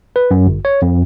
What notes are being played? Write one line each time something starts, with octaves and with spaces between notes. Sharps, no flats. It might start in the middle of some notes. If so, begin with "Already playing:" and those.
B4
F#2
G1
C#5
F2